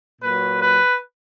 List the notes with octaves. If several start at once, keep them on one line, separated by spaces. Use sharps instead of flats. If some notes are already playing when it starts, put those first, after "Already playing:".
A#2 F#3 B4
B4